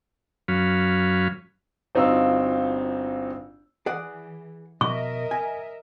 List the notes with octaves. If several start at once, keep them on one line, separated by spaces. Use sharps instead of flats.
F#2 F#3 C#4 F5 B5
G1 C4 D#4 F4 F#4 E6
E3 G#4 D5 F#5
B2 A#4 D#5 E5 C#6
G#5